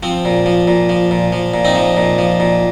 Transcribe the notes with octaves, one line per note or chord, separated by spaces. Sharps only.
F3 C4
A#2
F3
A#2
F3
A#2
F3
A#2
C4 D#4
F3
A#2
F3
A#2